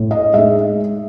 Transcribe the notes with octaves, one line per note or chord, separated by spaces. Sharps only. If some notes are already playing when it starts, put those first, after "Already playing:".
Already playing: A2
D#5
G#3 D#4 E5